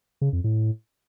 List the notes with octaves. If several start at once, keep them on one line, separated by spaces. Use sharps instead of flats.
C#3
F2
A2